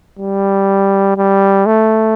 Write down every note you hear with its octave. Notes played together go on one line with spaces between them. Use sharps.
G3
G3
A3